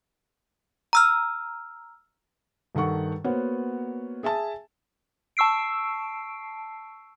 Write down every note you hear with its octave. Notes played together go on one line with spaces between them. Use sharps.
A#5 E6 F6
G2 D#3 A4 F#5 C#6
A#3 B3 F#4 C5 C#5
G#4 E5 G#5 A5
A5 C#6 E6 C7 D7